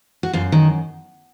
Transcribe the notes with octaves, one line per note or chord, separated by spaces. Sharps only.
F#4
F#2 F4
D#3